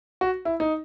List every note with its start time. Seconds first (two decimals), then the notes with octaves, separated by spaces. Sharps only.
0.21 F#4
0.45 E4
0.60 D#4